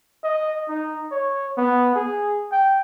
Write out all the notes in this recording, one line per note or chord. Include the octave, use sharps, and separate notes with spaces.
D#5
D#4
C#5
B3
G#4
G5